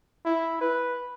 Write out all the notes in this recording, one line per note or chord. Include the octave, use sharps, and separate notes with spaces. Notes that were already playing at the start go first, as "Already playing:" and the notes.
E4
B4